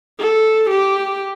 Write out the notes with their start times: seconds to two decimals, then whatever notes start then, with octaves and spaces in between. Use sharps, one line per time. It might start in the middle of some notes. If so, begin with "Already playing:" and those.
0.19 A4
0.70 G4